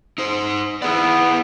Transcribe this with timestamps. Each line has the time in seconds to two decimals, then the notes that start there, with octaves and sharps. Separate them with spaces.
0.18 D#4 C5
0.82 B3 E4 G#4 D5